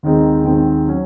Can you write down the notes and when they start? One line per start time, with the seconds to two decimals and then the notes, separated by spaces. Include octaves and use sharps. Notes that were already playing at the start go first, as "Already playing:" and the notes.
0.03 D#2 D#3 G#3 C4 D#4
0.44 D#2 D#3 G#3 C4 D#4
0.87 F#3 C#4